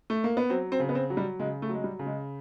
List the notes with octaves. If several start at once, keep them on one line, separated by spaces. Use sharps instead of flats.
A3
A#3
B3
F#3 C4
C4
C#3
B3
C4
F#3
G3
C#3 G#3
A3
F#3 G#3
G3
C#3
G#3